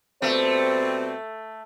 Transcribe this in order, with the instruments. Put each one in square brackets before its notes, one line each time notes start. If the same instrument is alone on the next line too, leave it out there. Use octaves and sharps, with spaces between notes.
[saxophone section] B2 G3 C4 [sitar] A3 [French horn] C5